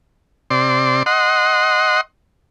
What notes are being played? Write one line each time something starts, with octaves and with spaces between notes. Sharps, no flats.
C3 D5 C6
D#5 F#5 C6